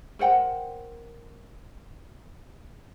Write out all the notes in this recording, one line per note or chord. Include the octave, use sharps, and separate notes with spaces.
A#4 C5 F#5 G5